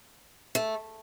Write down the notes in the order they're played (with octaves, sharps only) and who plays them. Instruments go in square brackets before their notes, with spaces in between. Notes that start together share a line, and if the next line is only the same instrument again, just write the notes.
[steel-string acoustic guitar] A3